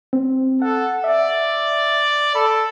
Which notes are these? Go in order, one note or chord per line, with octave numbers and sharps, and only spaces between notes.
C4
A4 F#5
D5 E5
A4 B5